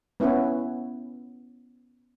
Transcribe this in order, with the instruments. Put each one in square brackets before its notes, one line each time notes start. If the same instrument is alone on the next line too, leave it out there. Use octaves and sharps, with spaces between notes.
[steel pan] B3 C#4 E4 B4